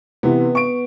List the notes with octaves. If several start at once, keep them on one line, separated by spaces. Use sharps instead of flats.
C3 E3 B3
C#6 D7